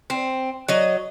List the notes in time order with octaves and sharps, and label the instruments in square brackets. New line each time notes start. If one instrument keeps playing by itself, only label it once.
[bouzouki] C4
F#3 D#5